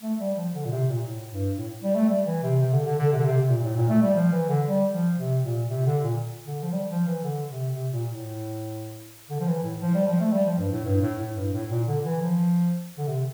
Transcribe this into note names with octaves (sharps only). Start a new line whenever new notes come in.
A3
G3
F3
D3
A#2
C3
A#2
A2
G2
A2
G3
A3
G3
E3
C3
C3
D3
D3
D3
C3
D3
C3
C3
A#2
A2
A#2
A3
G3
F3
E3
D3
G3
F3
C3
A#2
C3
D3
A#2
D3
F3
G3
F3
E3
D3
C3
C3
A#2
A2
D3
F3
E3
A2
F3
G3
F3
A3
G3
F3
G2
A2
G2
A2
A2
G2
A2
A#2
D3
E3
F3
D3
C3